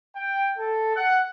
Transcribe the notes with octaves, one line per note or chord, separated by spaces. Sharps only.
G5
A4
F#5